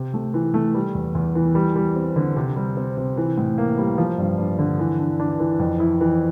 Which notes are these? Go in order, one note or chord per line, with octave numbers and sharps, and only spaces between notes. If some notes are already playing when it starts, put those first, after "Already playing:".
Already playing: C3
A3
E3
A3
G3
E2
E2
E3
G3
G3
C4
D3
C3
G3
C4
C3
E3
A2
A#3
G3
F3
G2
G2
D3
E3
D4
D4
E3
F2
E4
E3